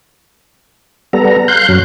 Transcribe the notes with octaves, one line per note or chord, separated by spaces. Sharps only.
G3 B3 A4 A#5
F5 C6 F#6 G6
F#2 F#3